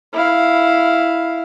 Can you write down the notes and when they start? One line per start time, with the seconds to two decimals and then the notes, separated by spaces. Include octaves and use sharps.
0.13 E4 F5